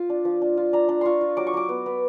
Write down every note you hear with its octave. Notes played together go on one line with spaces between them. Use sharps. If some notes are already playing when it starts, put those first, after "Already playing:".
Already playing: F4
D4
F3
D4
F4
D4 A#5
D4
F4 C6 C#6
F4
F#3 D6
C#6
F#3 D6
B3
B3